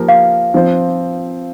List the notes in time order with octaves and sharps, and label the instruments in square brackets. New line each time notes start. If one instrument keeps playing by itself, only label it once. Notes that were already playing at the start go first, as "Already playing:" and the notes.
Already playing: [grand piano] F3 A#3 G4 A#4
[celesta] F5
[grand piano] F3 C4 F4 C5